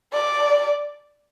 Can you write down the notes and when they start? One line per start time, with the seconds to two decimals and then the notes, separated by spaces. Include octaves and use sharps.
0.13 D5